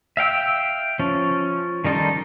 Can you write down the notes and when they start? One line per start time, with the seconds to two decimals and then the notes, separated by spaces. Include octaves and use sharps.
0.17 E5 F5 G5 E6
0.99 F3 C#4
1.85 D#3 G3 D#4 A4 C6